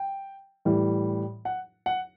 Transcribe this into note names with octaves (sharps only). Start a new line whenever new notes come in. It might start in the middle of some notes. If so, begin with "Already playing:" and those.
Already playing: G5
A2 E3 G3
F#5
F#5